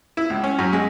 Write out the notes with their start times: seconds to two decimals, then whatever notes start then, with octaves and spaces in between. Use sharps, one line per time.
0.17 E4
0.30 C#2
0.44 C#4
0.59 F#2
0.73 G#3